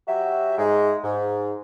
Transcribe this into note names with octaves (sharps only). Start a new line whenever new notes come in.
F#3 F#4 G4 E5
G#2 G#3
G#2